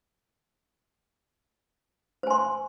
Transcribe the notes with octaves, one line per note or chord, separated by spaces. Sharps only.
C5 G#5 C6